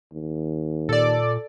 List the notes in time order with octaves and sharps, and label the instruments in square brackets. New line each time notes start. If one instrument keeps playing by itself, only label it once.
[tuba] D#2
[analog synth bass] A#2 [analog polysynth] A4 D5